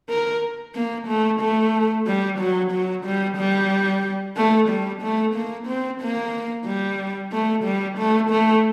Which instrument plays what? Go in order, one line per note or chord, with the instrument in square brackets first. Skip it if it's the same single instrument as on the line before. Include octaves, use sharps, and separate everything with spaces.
[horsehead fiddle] A#4
A#3
A3
A3
G3
F#3
F#3
G3
G3
A3
G3
A3
A#3
C4
A#3
G3
A3
G3
A3
A3